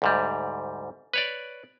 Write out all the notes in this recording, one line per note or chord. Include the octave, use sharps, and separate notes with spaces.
D2 G#2 G3
B4 C#5 D5